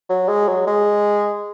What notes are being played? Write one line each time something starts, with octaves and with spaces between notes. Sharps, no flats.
F#3
G#3
F#3
G#3